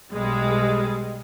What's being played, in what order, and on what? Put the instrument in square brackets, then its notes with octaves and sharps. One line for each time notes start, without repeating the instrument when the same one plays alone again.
[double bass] B1 [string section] G3 G#3